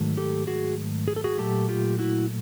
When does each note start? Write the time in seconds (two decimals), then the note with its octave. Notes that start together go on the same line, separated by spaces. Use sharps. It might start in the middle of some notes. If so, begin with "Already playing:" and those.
Already playing: G#2 D#3 F#3 A3
0.17 G4 A4
0.47 F#4 G#4
1.08 G#4
1.16 A4
1.24 F#4 G#4
1.38 A#2 F#3 A3 G4 A4
1.69 F4 G4
1.99 E4 F#4